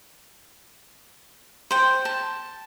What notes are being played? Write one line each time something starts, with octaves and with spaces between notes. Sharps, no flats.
C5 G5
A5